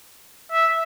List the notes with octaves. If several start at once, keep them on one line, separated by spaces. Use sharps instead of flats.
E5